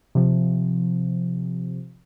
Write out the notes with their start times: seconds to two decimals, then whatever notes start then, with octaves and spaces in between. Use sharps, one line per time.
0.15 C3 F3